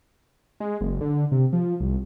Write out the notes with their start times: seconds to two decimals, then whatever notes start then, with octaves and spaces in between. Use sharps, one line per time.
0.60 G#3
0.81 F#1
1.01 D3
1.32 C3
1.53 F3
1.80 C2